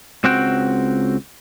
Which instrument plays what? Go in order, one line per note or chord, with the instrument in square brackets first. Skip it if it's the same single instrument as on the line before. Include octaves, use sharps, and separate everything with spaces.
[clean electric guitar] C#2 C4 F#4 F#5 G5